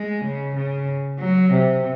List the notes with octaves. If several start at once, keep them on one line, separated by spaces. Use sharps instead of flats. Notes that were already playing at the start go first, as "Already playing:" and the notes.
Already playing: G#3
C#3
C#3
F#3
C3